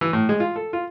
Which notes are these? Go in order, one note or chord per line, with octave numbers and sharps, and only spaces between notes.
E3
A2
G#3
F4
A4
F4